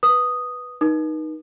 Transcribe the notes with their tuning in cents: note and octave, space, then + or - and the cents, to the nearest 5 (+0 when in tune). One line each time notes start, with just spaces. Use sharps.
B4 +0 D#6 -5
D#4 +0 B4 -45 D#6 -40